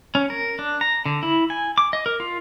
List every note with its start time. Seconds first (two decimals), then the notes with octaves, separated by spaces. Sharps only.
0.15 C#4
0.30 A#4
0.59 D4
0.81 A#5
1.06 D3
1.23 E4
1.50 G#5
1.78 D6
1.93 D#5
2.06 A#4
2.20 F4